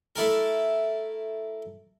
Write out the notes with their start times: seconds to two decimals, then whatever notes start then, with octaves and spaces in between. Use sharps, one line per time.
0.16 A3 E4 A4 A#4